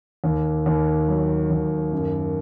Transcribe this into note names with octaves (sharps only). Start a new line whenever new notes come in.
D#2
D#2
F#3
D#2
F#2